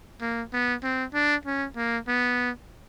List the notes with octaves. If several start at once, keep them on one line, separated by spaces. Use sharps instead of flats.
A#3
B3
C4
D4
C#4
A#3
B3